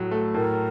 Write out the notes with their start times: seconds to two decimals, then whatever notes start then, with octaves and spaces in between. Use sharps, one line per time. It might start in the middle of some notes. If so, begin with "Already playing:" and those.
Already playing: A2 F#3 A3
0.11 A3
0.34 A2 A#4